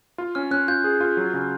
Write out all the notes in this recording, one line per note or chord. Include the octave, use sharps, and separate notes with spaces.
F4
C#4 F6
C#4 F#6
F4 G6
G#4
F4
F#3
C#3